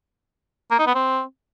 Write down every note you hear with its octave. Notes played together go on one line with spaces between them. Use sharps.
A#3
D#4
B3
C4